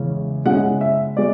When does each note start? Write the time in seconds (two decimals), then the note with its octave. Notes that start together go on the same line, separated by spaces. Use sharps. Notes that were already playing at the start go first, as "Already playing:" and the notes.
Already playing: E2 C#3 G#3 C#4
0.45 C#3 G#3 C#4 E4 F#5
0.81 E5
1.17 G#3 D5